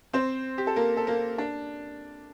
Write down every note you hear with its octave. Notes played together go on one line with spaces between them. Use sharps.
C4 C5
G4
A4
A#3 A#4
A4
A#3 A#4
D4